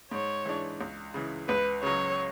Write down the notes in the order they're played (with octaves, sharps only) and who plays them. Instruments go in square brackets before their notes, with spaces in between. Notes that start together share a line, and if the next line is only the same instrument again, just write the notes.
[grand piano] G#2 [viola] C#5
[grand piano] E3 G#3 D4
C#2
C#3 E3
[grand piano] C#2 [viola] B4
[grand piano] C#3 F#3 [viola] C#5